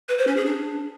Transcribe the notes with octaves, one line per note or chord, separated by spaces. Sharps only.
B4
C5
C#4
G#4
D4